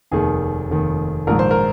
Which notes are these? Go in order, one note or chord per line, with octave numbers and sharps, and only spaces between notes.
F1 D#2 D#3 G#4
F1 D#2 D#3
A#1 G#2 D#3 A#4
C5
A#4